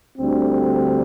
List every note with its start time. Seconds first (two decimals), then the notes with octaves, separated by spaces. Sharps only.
0.16 D2 D3 G3 C4